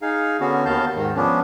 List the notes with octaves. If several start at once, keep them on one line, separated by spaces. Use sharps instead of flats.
D#4 G#4 F5
D3 B3 C#4 F#4
D#2 D#3 B3 F5 A5 G6
G#2 D#3
F3 B3 C#4 D4